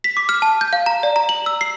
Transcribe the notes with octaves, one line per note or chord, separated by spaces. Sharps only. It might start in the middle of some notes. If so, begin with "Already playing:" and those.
B6
D6
F6
A5
G6
F5
A#5
D5
A#5
F#7
E6
C7